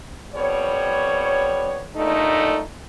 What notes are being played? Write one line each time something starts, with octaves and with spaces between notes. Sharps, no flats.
F2 G3 B3 C#5
G2 A#2 D3 A3 D#4